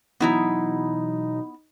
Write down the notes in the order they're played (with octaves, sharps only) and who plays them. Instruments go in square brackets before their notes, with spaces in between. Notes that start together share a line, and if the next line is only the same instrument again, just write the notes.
[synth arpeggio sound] B2 E3 F#3 [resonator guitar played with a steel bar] B3 E4 A#5 [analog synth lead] D#4